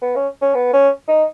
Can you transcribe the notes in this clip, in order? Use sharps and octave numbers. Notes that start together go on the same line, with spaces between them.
B3
C#4
C#4
B3
C#4
D#4